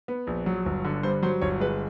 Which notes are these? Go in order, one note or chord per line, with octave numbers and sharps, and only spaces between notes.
B3
A#1
F#3
G1
D3
G2 C5
F#3 C5
G1 C#5
G#3 B4